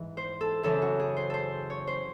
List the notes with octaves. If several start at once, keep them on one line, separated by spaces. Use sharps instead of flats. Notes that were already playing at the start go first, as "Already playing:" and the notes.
Already playing: G#2 E3
C5
A4
F#2 C#3 E3 A4
F#4
G#4
C5
A4 C5
C#5
C5